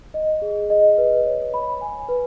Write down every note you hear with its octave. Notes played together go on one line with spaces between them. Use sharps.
D#5
G#4
D#5
B4
C#5
B5
G#5
B4